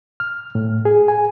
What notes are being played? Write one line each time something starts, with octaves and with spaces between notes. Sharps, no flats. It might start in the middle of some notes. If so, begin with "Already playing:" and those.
F6
A2
G#4
G#5